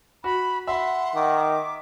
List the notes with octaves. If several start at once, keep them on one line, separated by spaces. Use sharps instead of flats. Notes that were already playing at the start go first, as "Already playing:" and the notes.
F#4 B5
E5 F#5 B5 C6
D#3 D6